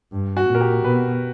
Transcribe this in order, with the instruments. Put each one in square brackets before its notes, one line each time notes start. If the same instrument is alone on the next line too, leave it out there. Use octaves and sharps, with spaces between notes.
[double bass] G2
[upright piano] F#4
[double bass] A#2
[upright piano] A#4
G4
[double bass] B2 [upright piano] B4